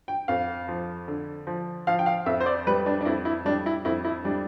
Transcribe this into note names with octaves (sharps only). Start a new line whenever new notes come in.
G5
F2 F5
F3
D3
F3
F3 F5
G5
F5
F2 E5
C5
D5
G3 B4
D4
D4
F2 E4
E4
G3 D4
E4
F2 E4
E4
G3 D4